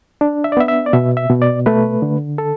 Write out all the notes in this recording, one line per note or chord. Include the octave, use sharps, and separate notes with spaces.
D4
E5
D5
B3 E5
E5
D5
B2 E5
E5
B2
D5
A3 B4
D3
A4